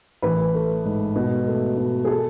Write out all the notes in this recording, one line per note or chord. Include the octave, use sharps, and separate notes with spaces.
A1 B4
A3
G#2
B2
A3
B2
G#4
A4